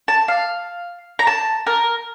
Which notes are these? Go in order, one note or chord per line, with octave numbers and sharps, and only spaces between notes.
A5
F5
A#5
A5
A#4